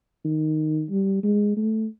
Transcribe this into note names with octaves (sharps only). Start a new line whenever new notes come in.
D#3
G3
G#3
A3